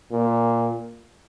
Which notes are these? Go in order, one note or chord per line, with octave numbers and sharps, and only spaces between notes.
A#2